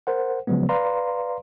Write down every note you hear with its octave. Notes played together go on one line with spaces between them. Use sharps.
A#4 C5 F#5
C#3 F3 F#3 G#3 B3
B4 D5 F5 A#5 C6